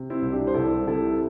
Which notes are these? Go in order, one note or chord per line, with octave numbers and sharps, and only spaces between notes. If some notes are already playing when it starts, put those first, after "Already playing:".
Already playing: C3
C4 E4
C2
D4 G4
C5
C2 E4 A4
C3 E4 A4